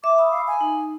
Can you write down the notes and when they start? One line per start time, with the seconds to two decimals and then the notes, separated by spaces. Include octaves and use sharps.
0.04 E5 D6
0.18 B5 D#6 E6
0.31 F5
0.48 G#5
0.61 D#4